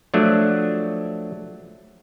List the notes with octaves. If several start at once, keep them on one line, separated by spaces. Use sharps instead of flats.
F3 F#3 A3 D4